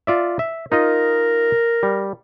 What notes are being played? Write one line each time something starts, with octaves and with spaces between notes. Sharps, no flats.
F4 D5 E5
E5
D#4 F4 A#4 D#5
G3